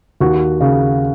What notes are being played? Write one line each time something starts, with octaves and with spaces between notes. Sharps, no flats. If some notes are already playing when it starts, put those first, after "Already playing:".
D#2 F#4
C#3